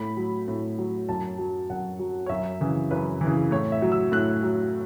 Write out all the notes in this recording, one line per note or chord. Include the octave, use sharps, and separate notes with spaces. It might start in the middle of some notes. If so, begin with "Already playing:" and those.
Already playing: A2 B5
F#3
A2
F#3
F#2 A5
F#3
F#2 F#5
F#3
C#5
F#2 E5
C#3 E3
F#2 B4
E3
C#3
A2 C#5
E5
F#3
E6
A2 F#6
F#3